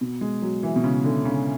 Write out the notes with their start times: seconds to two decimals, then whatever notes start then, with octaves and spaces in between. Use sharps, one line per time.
0.01 B2
0.21 G#3
0.42 F#3
0.63 E3
0.76 B2
0.84 C#3
1.04 D3
1.25 C#3